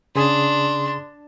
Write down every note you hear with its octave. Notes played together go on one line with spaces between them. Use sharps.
C#3 D4 G#4 C6 D#6